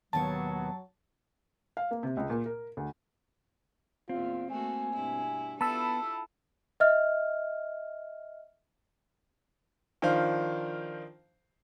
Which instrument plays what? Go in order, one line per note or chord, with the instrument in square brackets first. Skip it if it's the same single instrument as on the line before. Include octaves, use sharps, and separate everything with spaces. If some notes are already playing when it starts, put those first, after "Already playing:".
[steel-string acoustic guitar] D#2 B2 C#5 [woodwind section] F#3 [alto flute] B3 [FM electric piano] A5
[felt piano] F5
A#3
C3
C#2
A#2
A#4
D2
[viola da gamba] E2 A#2 [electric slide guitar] C4 [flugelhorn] F4
[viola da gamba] A3 A#3 F#4 [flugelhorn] G#5
[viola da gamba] G2 B2 E4
[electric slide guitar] B3 [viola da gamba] E4 F4 A4 [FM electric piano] A5 B5 E6
[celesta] D#5 E5 F6
[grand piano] D#3 F3 D4 C5 F5